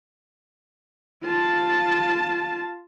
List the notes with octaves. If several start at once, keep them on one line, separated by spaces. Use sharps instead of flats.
F4 A5